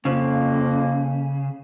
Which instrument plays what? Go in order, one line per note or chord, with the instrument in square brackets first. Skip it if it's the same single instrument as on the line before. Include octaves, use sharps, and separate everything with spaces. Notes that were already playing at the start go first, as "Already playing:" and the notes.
[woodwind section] F2 A#3 [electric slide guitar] C#3